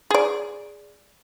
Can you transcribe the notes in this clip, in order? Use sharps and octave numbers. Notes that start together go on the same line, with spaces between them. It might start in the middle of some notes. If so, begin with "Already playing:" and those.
G#4 D5